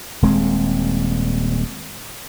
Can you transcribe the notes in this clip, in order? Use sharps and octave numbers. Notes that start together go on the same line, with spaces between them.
D#1 G#3 C4